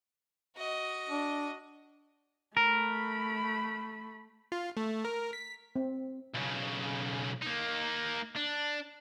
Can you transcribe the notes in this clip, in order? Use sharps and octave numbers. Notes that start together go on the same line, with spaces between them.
F#4 D#5
D4
A3 A#4 B5
F4
A3
A#4
B6
C4
B1 C#3
A#3 D#4
D4